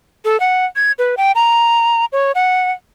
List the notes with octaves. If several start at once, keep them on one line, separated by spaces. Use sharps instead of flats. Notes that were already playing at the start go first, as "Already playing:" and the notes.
A4
F#5
G#6
B4
G5
A#5
C#5
F#5